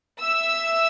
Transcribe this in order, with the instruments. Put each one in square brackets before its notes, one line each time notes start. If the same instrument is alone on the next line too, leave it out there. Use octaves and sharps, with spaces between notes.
[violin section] E5 E6